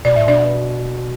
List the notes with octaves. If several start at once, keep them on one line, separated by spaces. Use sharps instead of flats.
B2 D5
A2 E5
B2 D4 D5